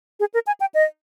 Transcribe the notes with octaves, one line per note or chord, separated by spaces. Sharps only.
G#4
A#4
G#5
G5
D#5